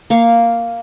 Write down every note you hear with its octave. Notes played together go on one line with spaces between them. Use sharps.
A#3 F5 C#6